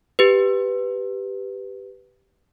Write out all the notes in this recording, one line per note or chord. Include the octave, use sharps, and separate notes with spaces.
G4 B4